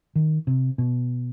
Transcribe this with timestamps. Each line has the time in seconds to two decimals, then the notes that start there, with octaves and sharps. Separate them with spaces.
0.15 D#3
0.47 C3
0.78 B2